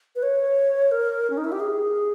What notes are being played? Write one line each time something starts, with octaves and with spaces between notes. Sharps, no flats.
B4
C#5
A#4
C#4
D#4
E4
G4
G#4